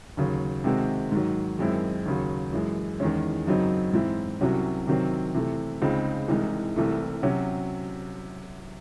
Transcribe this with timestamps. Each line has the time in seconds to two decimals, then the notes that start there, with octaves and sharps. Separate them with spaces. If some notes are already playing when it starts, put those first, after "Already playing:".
0.17 D#2 C#3 F#3
0.64 C3 D#3 G#3 C4 F#4
1.12 G#2 D#3 F#3
1.59 F#2 D#3 G#3 C4 E4
2.06 D#2 C#3 F#3
2.53 F#2 E3 G#3
3.00 E2 D#3 G#3 C#4
3.47 F#2 C#3 F#3 C4 D#4
3.93 G#2 E3 C4 E4
4.41 C2 C3 F#3 C#4 F#4
4.87 C3 D#3 F#3 C4
5.34 C3 E3 A3
5.82 C#2 C#3 G#3 C4 D#4
6.28 C2 C3 E3 G#3 D#4
6.76 C2 C3 E3 A3
7.23 C3 F#3 C#4 F#4